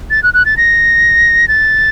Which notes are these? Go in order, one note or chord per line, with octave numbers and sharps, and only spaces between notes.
A6
F#6
F#6
A6
A#6
A6